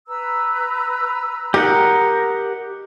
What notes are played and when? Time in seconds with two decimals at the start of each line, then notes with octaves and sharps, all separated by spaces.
0.07 B4 A#5 E6
1.54 D#4 G4 A#4 F#5